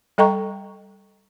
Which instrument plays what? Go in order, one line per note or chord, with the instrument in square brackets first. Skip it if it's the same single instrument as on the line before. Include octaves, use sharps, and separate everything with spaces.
[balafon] G3 A4 D#5 G5 A#5 C#6